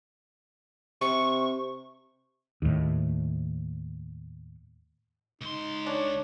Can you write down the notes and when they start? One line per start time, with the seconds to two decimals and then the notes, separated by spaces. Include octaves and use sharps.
1.01 C3 C#6
2.62 D#2 A2
5.41 C#2 D#4 C6
5.87 D4 C#5